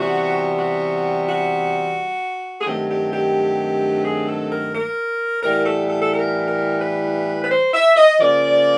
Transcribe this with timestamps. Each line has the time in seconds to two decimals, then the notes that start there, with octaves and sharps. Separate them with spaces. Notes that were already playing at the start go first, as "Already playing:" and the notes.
Already playing: C3 E3 G3 B3 F#4
0.59 F#4
1.29 F#4
2.61 G#4
2.66 G2 D#3 F#3 A3 C4 G4
2.90 G4
3.13 G4
4.05 G#4
4.29 A4
4.52 A#4
4.75 A#4
5.43 A2 E3 G3 B3 A#4
5.66 A4
5.89 A4
6.02 A4
6.13 A#4
6.47 A#4
6.82 B4
7.44 B4
7.50 C5
7.74 E5
7.97 D#5
8.20 C#3 F3 A#3 D5